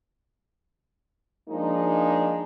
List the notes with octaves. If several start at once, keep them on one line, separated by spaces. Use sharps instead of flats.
F3 G#3 A#3 D4 D#4